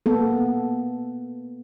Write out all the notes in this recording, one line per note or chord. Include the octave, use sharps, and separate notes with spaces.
A#3 B3 A4